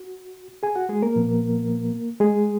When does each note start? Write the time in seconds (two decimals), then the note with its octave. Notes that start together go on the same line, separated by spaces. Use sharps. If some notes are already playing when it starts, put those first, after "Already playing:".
Already playing: F#4
0.63 G#4 G#5
0.76 F#4 F#5
0.89 G#3 G#4
1.02 A#3 A#4
1.16 A#2 F3 B3
2.20 G#3 G#4